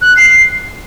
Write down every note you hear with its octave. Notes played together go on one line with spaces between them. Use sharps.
F#6
C7
C7